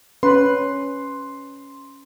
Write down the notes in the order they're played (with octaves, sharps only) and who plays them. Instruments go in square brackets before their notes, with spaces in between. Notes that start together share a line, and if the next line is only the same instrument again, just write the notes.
[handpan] C#4 [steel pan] B4 [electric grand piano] C6